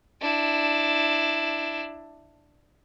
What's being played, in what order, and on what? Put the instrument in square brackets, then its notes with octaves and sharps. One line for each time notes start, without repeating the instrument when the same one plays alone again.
[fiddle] D4 E4